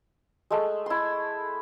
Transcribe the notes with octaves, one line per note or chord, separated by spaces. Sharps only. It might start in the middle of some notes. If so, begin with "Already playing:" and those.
G#3 A3
E4 C6